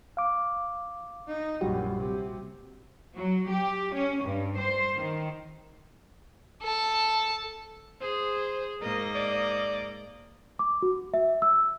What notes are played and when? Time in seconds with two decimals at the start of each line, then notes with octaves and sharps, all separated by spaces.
0.17 F5 D6
1.28 D#4
1.61 A#1 F#2 G3 F#4 G4
1.99 C3
3.16 F#3
3.50 G4
3.94 C#4
4.25 G2
4.59 C5
4.96 D#3
6.62 A4 A5
8.01 G#4 C5
8.82 G#2 A#3 A#4 D#5
9.15 D5
10.59 D6
10.82 F#4
11.14 E5
11.42 E6